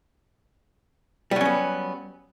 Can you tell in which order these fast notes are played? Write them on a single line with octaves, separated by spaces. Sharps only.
G3 F#3 C#4 B3